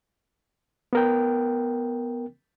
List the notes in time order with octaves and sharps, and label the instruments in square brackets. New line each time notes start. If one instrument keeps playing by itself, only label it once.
[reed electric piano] B3 A#4 G5